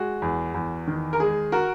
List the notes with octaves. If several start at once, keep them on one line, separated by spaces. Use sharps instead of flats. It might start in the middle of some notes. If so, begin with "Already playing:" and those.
Already playing: G#3 F#4
E2
E2
D#3
A#4
G#3 G#4
F#4 A#4